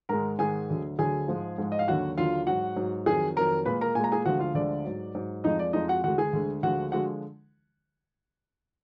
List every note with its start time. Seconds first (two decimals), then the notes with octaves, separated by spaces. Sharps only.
0.09 G#2 D#3 G#3 A#4 A#5
0.39 G#2 D#3 G#3 G#4 G#5
0.69 D2 D3 F#3
0.99 D2 D3 F#3 G#4 G#5
1.28 G#2 F3 G#3
1.58 G#2 F3 G#3
1.72 D#5
1.79 F5
1.88 D#2 D3 F#3 F#4 F#5
2.18 D#2 D3 F#3 F4 F5
2.47 G#2 F#3 F#4 F#5
2.76 G#2 F#3
3.06 F2 D#3 F#3 G#4 G#5
3.36 F2 D#3 F#3 A#4 A#5
3.65 A#2 G#3 B4 B5
3.81 A#4 A#5
3.95 A#2 G#5
4.00 G#3 A#5
4.12 G#4 G#5
4.25 D2 D3 F3 G#3 F#4 F#5
4.40 F4 F5
4.54 D2 D3 F3 G#3 D5
4.85 G#2 F#3
5.15 G#2 F#3
5.44 F2 F3 G#3 D#4 D#5
5.59 D5
5.73 F2 F3 G#3 D#4 D#5
5.88 F#4 F#5
6.04 D2 D3 G#3 F#4 F#5
6.18 G#4 G#5
6.33 D2 D3 G#3
6.63 D2 D3 F3 G#3 F#4 F#5
6.92 D3 F3 G#3 F#4 F#5